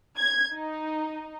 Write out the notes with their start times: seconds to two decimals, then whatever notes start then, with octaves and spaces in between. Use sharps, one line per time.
0.19 G#6
0.55 D#4